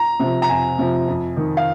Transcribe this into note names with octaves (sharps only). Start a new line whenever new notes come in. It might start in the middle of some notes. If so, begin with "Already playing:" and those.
Already playing: A#5
C3 F3
A#5
F2 G#5
C3 F3
F2
D#3
F5